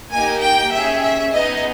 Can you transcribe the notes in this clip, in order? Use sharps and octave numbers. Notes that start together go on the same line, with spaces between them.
A#3 D#4 G4 G#5
G5
C#4 G#4 E5
E5
B3 D#4 G#4 D#5